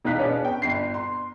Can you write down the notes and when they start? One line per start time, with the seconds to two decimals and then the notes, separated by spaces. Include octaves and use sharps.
0.05 E1 D#4 D#5 F5 F#6 B6
0.18 B3 C#4 D4 G#4
0.45 G5
0.62 G1 C7
0.94 C6